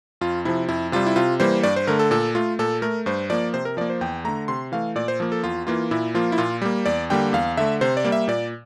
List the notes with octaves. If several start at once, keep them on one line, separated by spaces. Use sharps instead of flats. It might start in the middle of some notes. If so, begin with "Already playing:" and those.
F2 F4
C3 F3 E4
F2 E4
C3 G3 F4
E4
C3 F4
E3 G3 A#3 C5
G2 D5
C5
D3 A3 A#4
A4
A#2 A4
A3 F4
A#2 A4
A3 A#4
G2 C5
F3 A#3 D5
C3 C5
A#4
F3 A#3 D5
C5
E2 G5
D3 A3 A#5
C3 C6
E3 A3 F5
A#2 D5
C5
F3 A#3
A4
E2 F4
E3 A#3 F4
A#2 E4
F3 A#3 F4
E4
A#2 F4
G3 A#3
E2 D5
D3 G3 A#3 G5
E2 F5
D3 A3 E5
C3 C5
D5
G3 A#3
E5
A#2 D5